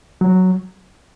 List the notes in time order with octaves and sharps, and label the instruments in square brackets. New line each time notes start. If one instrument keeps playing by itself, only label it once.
[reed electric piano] F#3